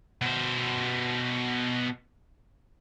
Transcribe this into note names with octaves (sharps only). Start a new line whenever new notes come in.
B2 C5